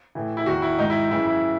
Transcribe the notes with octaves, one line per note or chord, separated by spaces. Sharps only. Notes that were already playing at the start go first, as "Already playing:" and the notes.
A2 E3
E4
E2 D#3 F#4
E4
G#2 D#3 D#4
E4
F#2 C#3 E3 E4
E4